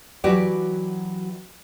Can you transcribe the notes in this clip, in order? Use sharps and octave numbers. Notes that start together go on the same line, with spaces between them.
E3 F#3 F#4 G4 B4 D5